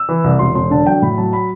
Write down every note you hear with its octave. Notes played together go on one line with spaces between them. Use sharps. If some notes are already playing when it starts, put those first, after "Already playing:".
Already playing: E6
E3
C2
E1 C6
E1 C6
D3 A5
F#3 G5
A2 B5
F#3 A5
B5